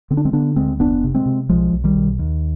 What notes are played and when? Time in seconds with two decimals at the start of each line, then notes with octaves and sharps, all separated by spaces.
0.11 D3 C4
0.17 D4
0.25 G#3 C4
0.33 D3 B3 D4
0.56 D2 G#3 C4
0.80 F1 B3 D4
1.04 C3
1.15 G#3 C4
1.26 C3
1.49 B1 F3 G#3
1.73 B1
1.84 D#3 G3
1.96 B1
2.19 D#2